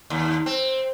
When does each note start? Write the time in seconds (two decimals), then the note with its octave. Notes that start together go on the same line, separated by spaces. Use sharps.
0.10 D#2
0.46 C4